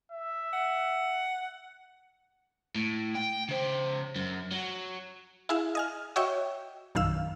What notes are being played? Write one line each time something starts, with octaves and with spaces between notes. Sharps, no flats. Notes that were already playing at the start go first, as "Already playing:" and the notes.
E5
F#5
A2
G5
C#3 C5
F#2
F#3
E4 G#4 E5 F5
D#5 G#5 F6
F#4 C#5 D#5 E5 G5 C#6
A#1 F#2 D#3 F5 E6